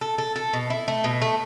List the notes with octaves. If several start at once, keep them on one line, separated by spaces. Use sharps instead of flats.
A4
A4
A4
B2
E4
A3
B2
A3